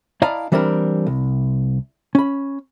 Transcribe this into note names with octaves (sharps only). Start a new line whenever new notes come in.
E4 D5 D#5 F5 A5 A#5
E3 G3 C4 D4 A4 A#4
C2
C#4 B5